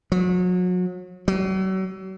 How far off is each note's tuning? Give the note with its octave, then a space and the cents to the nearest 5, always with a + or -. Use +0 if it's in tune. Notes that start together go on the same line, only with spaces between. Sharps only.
F#3 -35
F#3 +40